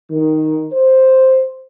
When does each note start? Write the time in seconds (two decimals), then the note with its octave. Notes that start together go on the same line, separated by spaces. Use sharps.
0.11 D#3
0.73 C5